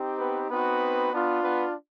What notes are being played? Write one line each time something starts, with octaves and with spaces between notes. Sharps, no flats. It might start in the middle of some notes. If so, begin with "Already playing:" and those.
Already playing: C4 D#4 G4
B3 B4
B3 C4 D#4 F#4 B4
B3 D4 F4
B3 B4